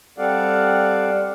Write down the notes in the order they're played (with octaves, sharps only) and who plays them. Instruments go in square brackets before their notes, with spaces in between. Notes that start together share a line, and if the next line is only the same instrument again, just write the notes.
[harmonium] G3 C4 A4 D5 F5 F#5